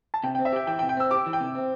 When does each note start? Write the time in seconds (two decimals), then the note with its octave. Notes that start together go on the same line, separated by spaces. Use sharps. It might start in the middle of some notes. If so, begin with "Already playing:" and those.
0.14 A5
0.24 C3 G5
0.35 G5
0.39 C4
0.45 E5
0.53 G4 G5
0.67 E3 G5
0.79 G5
0.82 C3
0.89 G5
0.97 C4 E6
1.11 G4 D6
1.26 E3
1.33 G5
1.41 C3
1.55 C4